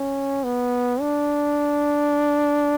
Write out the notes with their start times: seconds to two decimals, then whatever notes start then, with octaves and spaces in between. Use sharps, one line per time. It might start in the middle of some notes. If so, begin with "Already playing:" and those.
Already playing: C#4
0.45 B3
1.00 D4